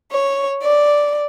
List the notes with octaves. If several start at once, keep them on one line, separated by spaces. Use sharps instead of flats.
C#5
D5